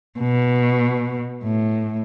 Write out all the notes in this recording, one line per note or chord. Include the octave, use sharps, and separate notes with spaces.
B2
A2